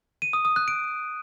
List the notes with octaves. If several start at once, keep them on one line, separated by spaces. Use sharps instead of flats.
D#7
D#6
D#6
F#6
D7